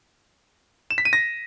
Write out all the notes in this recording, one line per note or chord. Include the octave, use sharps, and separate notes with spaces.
E7
B6
D#7
A#6